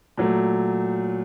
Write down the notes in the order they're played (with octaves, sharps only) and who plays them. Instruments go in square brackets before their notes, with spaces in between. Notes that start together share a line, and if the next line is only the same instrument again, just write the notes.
[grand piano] A#2 F#3 A3